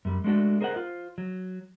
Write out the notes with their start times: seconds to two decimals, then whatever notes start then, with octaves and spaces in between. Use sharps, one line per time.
0.05 F#2 G3
0.24 G#3 A3 D4 F#4 A4
0.61 G#4 A#4 C5 D#5 F#5
0.76 F4 C5
1.18 F#3